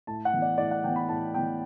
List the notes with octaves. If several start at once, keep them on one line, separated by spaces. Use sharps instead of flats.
A2 A5
F#5
E3 B3
D5
A2 D5
F#5
E3 B3 G5
B5
A2 A5
E3 B3 G5